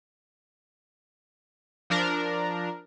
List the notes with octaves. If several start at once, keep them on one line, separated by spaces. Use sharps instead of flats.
F3 D4 A#4